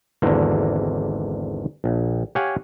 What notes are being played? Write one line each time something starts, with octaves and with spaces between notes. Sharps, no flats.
G#1 E2 D3 A#3
A#1
G4 C#5 F5 F#5 G#5